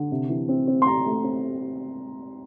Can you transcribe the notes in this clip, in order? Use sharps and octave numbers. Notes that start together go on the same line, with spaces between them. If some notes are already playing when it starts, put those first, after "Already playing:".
Already playing: D3
C3
E3
C4
C4
C6
C4 A#5
A3
C4